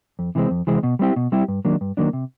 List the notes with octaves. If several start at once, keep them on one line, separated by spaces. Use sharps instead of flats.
F2
C3 E3 G#3 C4
F2
C3 E3 G#3 C4
B2
G3 C4 E4 G4
B2
G3 C4 E4 G4
G2
D#3 F#3 A#3 D4
G2
D#3 F#3 A#3 D4
C3